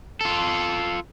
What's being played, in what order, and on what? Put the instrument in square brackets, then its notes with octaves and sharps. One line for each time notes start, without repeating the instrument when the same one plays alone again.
[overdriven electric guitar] F4 A4